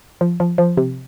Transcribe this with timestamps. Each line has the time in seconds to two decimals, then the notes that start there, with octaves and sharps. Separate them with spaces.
0.21 F3
0.40 F3
0.58 F3
0.77 C3